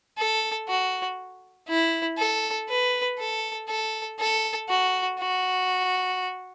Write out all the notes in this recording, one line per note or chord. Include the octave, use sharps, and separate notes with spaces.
A4
F#4
E4
A4
B4
A4
A4
A4
F#4
F#4